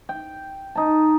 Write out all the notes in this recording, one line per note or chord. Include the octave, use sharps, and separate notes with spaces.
G5
D#4 A5